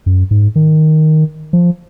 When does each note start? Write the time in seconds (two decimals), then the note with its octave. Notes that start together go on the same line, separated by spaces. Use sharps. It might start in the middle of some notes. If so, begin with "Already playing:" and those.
0.06 F#2
0.31 G#2
0.56 D#3
1.53 F3